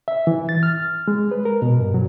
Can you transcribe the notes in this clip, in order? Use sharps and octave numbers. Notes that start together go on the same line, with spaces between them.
E5
E3
A6
F6
G#3
B4
A#4
B2
G2
F#3